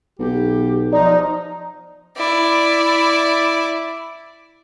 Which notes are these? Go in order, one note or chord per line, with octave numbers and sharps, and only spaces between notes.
B1 G4
F3 D#4 D5
E4 D5